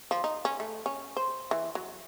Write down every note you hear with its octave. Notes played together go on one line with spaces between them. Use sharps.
F3
D#4
C#4
A3
C#4
C5
E3
F#3